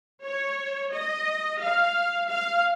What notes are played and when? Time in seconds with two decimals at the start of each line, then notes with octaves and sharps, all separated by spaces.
0.25 C#5
0.93 D#5
1.61 F5
2.30 F5